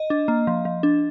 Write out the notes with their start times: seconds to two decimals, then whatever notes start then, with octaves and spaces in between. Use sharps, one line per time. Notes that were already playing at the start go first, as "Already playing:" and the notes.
Already playing: D#5
0.10 D4
0.28 A#3
0.47 F3
0.65 F3
0.83 D4